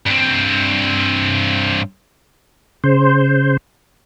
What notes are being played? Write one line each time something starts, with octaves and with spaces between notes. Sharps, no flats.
G2 C4
C#3 C5